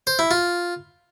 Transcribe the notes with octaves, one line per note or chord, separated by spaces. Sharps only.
C5
E4
F4